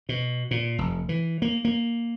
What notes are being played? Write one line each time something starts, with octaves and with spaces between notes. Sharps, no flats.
B2
A#2
F1
E3
A#3
A#3